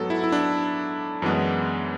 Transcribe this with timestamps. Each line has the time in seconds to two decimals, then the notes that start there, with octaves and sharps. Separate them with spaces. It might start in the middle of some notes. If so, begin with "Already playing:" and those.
Already playing: G#2 F#3 B3 A4
0.10 E4
0.24 E4
0.32 D4
1.22 F#2 E3 G#3 B3